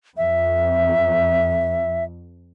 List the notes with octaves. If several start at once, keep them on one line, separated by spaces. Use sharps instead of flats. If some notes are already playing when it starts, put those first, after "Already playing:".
F2 E5